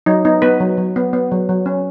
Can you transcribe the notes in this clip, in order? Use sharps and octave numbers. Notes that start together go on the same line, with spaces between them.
F#3 D#4
B3 D#4
B3 B4
F#3
F#3
B3
B3
F#3
F#3
C#4